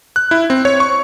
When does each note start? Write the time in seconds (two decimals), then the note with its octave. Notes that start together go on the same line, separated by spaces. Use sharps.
0.16 F#6
0.31 E4
0.50 C4
0.65 C#5
0.80 C#6